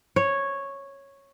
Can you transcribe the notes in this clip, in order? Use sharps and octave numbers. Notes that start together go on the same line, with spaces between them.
C#5